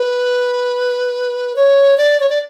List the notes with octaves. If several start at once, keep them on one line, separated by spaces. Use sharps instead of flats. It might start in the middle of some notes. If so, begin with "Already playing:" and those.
Already playing: B4
C#5
D5
C#5
D5